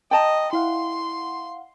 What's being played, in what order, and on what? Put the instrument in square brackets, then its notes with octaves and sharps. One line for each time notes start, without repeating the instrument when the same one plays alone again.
[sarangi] D#5 [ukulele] G5 A5 A#5
[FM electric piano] E4 F5 F#5 [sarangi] C6